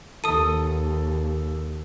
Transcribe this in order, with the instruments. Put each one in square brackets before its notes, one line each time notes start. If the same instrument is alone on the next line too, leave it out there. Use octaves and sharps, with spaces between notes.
[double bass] D#2 [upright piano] A4 [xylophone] D#6 D#7